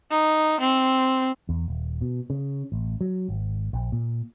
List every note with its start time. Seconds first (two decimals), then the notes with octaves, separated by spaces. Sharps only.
0.10 D#4
0.60 C4
1.49 E2
1.68 D#1
2.01 B2
2.30 C#3
2.72 A1
3.01 F#3
3.28 G#1
3.73 A#1
3.92 A#2